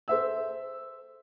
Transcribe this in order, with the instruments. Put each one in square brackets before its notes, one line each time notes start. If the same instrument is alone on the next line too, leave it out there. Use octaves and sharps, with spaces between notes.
[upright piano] A4 C5 E5 E6